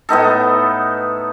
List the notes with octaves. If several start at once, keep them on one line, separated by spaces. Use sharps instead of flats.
A2 B3 D#4 A4